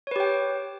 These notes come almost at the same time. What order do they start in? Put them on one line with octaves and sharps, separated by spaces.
C#5 B4 G4 G5